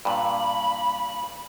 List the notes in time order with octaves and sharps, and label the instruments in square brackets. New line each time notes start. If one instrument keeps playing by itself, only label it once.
[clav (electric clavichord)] G2 A#2 [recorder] B5